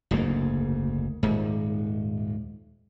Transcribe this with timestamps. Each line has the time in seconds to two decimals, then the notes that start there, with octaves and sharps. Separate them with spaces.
0.11 F#1 D2 G#2 A#3
1.23 D#1 G#2